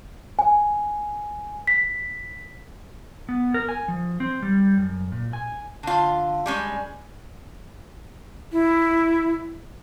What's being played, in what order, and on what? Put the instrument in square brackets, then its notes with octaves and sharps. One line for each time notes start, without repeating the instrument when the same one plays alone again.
[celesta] G#5
B6
[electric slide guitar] B3
A#4
G#5
F3
C4
G3
F#2
A#2
G#5
[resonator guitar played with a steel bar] D3 F4
G3 G#3 C#4
[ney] E4